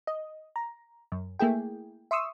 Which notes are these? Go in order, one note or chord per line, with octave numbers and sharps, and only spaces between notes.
D#5
A#5
F#2
A3 A#3 E4 G#4 G5
E5 C6 C#6 D#6 E6